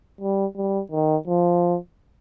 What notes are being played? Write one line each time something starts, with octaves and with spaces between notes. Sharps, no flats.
G3
G3
D#3
F3